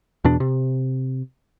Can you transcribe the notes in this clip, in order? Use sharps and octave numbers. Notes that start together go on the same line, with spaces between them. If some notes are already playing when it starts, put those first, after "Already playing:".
E2 B2 D4
C3